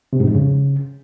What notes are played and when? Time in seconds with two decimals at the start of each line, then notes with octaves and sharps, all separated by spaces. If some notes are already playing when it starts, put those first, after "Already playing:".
0.13 C3
0.20 G#2
0.27 F2
0.35 C#3